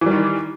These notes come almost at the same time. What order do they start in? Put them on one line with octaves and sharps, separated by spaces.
E3 G3 D#3